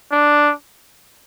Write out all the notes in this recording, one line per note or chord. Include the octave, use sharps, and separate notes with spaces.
D4